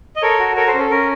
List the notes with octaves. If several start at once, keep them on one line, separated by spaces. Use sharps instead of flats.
D#5
A4 A#4 C#5
F#4
A4 A#4 C#5
A4 C5
C#4
A4
C#4 A#4